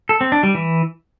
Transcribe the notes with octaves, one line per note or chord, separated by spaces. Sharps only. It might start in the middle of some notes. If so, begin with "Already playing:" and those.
A4
C4
D4
G3
E3